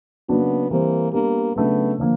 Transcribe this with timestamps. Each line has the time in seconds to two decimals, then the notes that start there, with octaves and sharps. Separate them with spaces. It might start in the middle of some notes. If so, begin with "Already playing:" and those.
0.28 C#3 F#3 A#3 B3 D4 F#4
0.71 E3 G3 A#3 C4
1.13 G3 A#3 B3 D4
1.56 C#3 F#3 A3 B3 D4
1.98 D3 F3 A#3